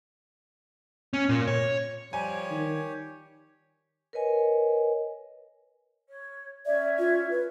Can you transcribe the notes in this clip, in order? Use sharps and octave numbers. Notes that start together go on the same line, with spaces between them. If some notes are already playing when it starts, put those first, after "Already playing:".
C#4
A#2
C#5
F3 G3 G4 C#5 G#5
D#3
A#4 B4 C#5 D#5 G#5
C#5
C#4 D5 E5 G#6
F4
B4